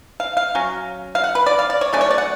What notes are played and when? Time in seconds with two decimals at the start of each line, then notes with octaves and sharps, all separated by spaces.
0.20 F5
0.37 F5
0.55 F#3 C#4
1.15 F5
1.24 F#5
1.35 B4
1.46 D5
1.59 F5
1.70 D5
1.81 C#5
1.93 F#3 A3 C#4 D5
2.01 C#5
2.11 D5
2.18 F#5